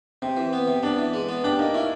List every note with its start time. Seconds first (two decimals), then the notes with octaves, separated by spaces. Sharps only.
0.22 C3 C4
0.37 E3
0.53 B3
0.68 C3
0.83 B3 D4
0.98 E3
1.13 G#3
1.29 B3
1.44 D4 G4
1.59 A#3 D#4
1.74 C#4 E4